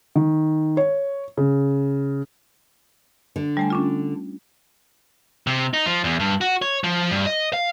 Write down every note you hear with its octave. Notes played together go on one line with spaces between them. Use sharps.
D#3
C#5
C#3
D3
G3 A3 G#5
C#4 D4 F4
C3
D#4
F3
E2
G2
F#4
C#5
F3
G2
D#5
F5